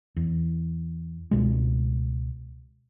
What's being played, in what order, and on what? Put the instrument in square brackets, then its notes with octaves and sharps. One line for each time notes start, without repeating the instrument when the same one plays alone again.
[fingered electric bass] E2
C#2 B2 G#3